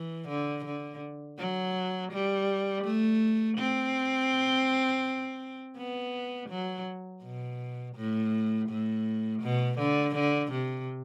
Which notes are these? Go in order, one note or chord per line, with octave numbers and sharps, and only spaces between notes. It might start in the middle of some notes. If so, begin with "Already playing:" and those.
Already playing: E3
D3
D3
F#3
G3
A3
C4
B3
F#3
B2
A2
A2
B2
D3
D3
C3